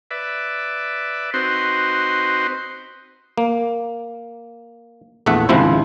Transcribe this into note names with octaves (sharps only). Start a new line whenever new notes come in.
B4 D5 E5
C4 D#4 F#4 B4 C5 C6
A#3
A#1 E2 A3 E5 F#5
G#1 C#2 C3 F3 E4 C5